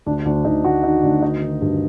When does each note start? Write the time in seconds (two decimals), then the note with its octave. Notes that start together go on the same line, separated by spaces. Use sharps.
0.06 D2 D4
0.25 D2 D4
0.44 D2 D#4
0.64 D2 F#4
0.83 D#3 D#4
1.03 D2 D4
1.22 D#3 D#4
1.42 D#3
1.61 G2